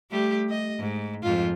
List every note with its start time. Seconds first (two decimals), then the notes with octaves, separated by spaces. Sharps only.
0.10 G3 A3 G4
0.49 D#5
0.79 G#2
1.23 F2 G#2 F4